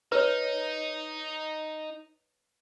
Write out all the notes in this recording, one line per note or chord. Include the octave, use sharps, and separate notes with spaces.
D#4 B4 C#5